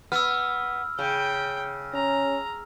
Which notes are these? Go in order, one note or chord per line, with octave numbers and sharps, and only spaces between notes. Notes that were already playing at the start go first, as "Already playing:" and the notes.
B3 E6 F6
C#3 G5
C#4 A#5